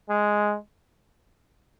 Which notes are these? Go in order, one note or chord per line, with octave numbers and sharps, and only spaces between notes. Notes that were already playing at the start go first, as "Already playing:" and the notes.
G#3